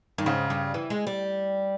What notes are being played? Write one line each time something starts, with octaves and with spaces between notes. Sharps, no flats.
G2 D#3
G#2 C#3
G2
E3
G#3
G3